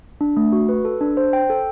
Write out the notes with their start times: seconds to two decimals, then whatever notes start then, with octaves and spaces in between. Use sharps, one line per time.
0.21 D4
0.37 A3
0.52 F#4
0.69 B4
0.85 A4
1.01 D4
1.17 C5
1.33 G5
1.50 A4